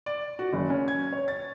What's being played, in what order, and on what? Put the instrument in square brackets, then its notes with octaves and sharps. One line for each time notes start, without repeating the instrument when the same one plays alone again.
[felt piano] D5
F#4
F#1
C#4
G#6
C#5
A6